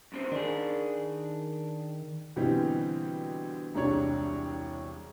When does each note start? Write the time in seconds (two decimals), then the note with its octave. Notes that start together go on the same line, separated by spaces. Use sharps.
0.12 F#2 C3 C4
0.32 D#3 D4 G#4
2.36 B2 D3 E3 G3 C4
3.74 E1 C2 C3 D4 C#5